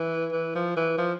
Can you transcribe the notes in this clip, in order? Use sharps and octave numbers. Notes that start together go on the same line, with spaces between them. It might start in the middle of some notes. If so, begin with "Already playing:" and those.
Already playing: E3
E3
F3
E3
F3